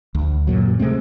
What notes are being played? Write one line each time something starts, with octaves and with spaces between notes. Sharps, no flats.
D2
F#2 A#2 F#3
C3 G#3 A3 C4